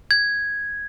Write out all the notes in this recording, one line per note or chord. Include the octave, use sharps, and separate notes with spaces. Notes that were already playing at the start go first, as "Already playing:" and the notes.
G#6